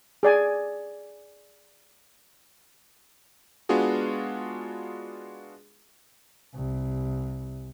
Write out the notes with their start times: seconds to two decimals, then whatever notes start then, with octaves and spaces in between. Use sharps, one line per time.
0.23 G#4 D5 G#5
3.69 G#3 B3 D4 F4 F#4 G#4
6.55 C2